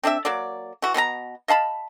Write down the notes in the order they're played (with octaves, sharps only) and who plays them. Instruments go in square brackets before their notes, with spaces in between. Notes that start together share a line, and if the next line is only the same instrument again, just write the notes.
[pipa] C4 D4 D5 E5
F#3 A#3 D5
E3 F#4
B2 B3 C#4 A#5
D#5 F5 A5 B5